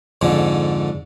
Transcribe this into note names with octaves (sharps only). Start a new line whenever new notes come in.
F2 G#2 D3